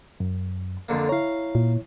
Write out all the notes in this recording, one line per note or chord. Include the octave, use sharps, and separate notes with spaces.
F#2
F2 D3 A#3
E4 C#5 F5 A#5
A#2